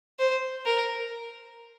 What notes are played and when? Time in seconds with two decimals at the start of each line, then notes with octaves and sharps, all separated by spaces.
0.19 C5
0.66 A#4